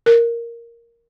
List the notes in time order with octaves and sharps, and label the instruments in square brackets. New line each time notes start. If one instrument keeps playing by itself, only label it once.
[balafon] A#4